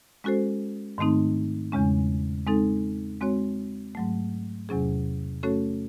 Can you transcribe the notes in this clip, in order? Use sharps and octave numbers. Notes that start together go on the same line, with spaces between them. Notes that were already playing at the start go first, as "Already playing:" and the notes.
G#3 C#4 F#4 A4 C5
G#2 D#3 A3 C4 D#4
E2 C#3 G#3 C#4
G#3 C4 D#4 A4
G#3 C4 F#4 C#5
G#2 F#3 A3
E2 C3 F#3 C#4 G#4
A3 C#4 F#4 A4 C#5